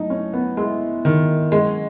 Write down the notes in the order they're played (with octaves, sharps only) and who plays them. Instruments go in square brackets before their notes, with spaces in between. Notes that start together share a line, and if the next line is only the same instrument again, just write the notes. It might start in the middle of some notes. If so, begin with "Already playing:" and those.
Already playing: [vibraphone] F#3 A3 E4 [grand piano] D#4
[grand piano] C#4
B3
[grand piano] G#3 [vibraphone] B3 E4 A4 E5
[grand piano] D#3
[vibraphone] F#3 C#4 G#4 D#5 F#5 [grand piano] G#3